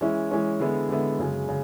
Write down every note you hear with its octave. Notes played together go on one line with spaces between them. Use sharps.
E3 G#3 C#4 E4
E3 G#3 C#4 E4
D3 G#3 B3 E4
D3 G#3 B3 E4
F#2 C#3 G#3
C#3